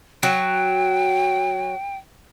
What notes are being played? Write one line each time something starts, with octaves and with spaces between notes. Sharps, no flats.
F#3 G5